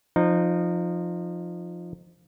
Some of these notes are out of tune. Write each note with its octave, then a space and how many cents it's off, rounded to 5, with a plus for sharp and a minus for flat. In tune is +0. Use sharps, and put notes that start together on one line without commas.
F3 +0 D#4 -25